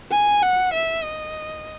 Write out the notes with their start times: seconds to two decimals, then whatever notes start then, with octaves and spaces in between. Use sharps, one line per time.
0.11 G#5
0.43 F#5
0.73 E5
1.04 D#5